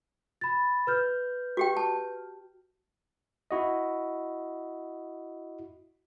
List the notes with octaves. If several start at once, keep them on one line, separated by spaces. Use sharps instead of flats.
B5 A6
B4 F6 G6
F#4 G4 G5
A5
E4 F#4 D#5